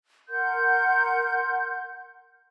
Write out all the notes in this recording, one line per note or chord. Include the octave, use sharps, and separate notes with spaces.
A#4 F#5 C6 G6